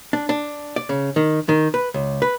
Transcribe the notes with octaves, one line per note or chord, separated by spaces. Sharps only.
D4
D4
D5
C#3
D#3
D#3
B4
C#2
B4